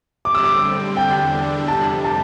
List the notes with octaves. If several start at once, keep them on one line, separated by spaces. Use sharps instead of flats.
D3 G3 C4 D6
E6
D6
E2 D3 G3 D4 G5
F2 C3 G3 A5
A5